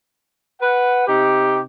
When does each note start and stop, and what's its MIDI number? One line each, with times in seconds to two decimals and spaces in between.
0.62 1.06 71
0.62 1.06 78
1.08 1.62 48
1.08 1.62 63
1.08 1.62 67